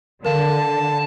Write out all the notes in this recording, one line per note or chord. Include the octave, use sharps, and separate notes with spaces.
D3 A#4 F5 A5